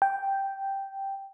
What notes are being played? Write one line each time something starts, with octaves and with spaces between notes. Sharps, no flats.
G5